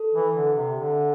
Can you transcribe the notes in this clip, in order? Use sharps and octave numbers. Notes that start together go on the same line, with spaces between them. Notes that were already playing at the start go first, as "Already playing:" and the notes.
Already playing: A4
E3
D3
C3
D3